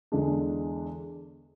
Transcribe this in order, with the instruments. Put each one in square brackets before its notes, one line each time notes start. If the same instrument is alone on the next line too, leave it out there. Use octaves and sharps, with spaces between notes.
[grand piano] E2 D3 G#3 D4